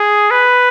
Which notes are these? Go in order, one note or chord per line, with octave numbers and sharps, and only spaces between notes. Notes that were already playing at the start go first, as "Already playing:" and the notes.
Already playing: G#4
B4